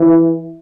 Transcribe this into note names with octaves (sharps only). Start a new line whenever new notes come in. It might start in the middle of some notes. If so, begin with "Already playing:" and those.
Already playing: E3